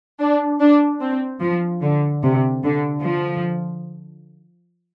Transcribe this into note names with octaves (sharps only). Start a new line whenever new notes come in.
D4
D4
C4
F3
D3
C3
D3
F3